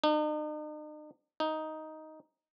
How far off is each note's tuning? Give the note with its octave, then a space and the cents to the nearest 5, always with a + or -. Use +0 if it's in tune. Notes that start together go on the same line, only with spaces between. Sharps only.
D#4 -45
D#4 +5